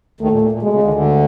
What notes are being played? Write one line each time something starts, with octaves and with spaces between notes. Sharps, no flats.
D#2 D#3 A3
A#2
A#2
A#2
B2 G#3
C#3
D2 D3
D#3
D2 D3